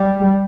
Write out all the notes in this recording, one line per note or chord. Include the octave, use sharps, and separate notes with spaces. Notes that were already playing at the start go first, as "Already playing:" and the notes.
Already playing: G3